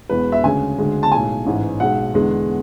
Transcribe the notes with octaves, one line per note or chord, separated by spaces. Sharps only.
E1 E2 B2 G#3 B4
E5
D2 C#3 G#3 G#5
D2 C#3 G#3
A5
B1 A2 G#3 G#5
A1 G#2 E3
B1 B2 G#3 F#5
E2 D3 G#3